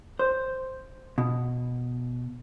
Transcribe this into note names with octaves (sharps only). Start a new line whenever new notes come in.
C5
B2